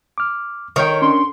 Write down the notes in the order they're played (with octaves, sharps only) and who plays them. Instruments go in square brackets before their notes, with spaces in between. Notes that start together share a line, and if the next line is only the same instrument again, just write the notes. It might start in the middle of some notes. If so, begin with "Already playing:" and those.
[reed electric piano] D6 F6
[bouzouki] D#3 [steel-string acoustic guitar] A#4 C#5 G5 [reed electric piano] C#6 G6
[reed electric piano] C#4 D4 [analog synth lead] C6